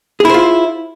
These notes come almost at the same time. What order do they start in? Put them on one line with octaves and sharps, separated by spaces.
G#4 E4 C5 F4